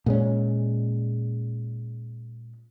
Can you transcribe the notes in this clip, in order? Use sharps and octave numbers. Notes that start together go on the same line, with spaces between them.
A#2 G#3 C#4